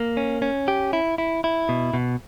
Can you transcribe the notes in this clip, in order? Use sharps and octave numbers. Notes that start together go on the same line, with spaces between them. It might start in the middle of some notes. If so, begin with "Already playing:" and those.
Already playing: A#3
C#4
C#4
G4
E4
E4
E4
B2
B2